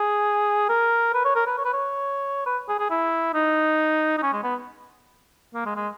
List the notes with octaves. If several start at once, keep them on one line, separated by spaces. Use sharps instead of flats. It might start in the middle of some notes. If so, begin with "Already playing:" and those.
Already playing: G#4
A#4
B4
C#5
A#4
B4
C#5
B4
C#5
B4
G#4
G#4
E4
D#4
D#4
C#4
G#3
B3
A#3
G#3
G#3